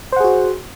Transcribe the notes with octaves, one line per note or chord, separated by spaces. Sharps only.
F#4 G#4 C5 F#5